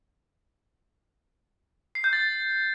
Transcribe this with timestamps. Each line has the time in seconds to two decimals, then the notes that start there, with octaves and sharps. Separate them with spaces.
1.95 C7
2.04 G6
2.13 A6